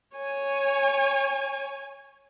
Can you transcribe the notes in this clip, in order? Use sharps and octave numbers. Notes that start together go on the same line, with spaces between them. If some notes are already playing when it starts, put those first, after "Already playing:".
C#5 G#5